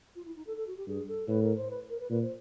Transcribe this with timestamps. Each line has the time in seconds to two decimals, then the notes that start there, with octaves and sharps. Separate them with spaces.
0.15 F4
0.25 E4
0.35 D#4
0.47 A4
0.57 A4
0.67 F#4
0.77 G4
0.87 G2 G#4
1.08 A4
1.28 A2 B4
1.42 A#4
1.56 C5
1.70 B4
1.90 A#4
2.00 B4
2.10 A#2 B4
2.22 C5